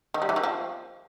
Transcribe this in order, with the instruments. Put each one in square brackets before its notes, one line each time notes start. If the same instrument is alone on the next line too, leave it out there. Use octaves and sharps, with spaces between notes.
[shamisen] D#3
G3
E3
D#3
F3